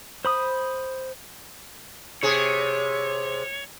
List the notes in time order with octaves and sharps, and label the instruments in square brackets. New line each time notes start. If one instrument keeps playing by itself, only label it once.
[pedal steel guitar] C5 B5 D#6
[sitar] C3 G#4 [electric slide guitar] C#5